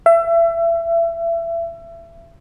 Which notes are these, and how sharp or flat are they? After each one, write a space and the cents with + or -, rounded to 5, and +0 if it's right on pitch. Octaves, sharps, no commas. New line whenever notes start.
E5 +30